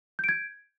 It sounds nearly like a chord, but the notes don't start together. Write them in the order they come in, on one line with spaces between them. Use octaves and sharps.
G6 D7 G#6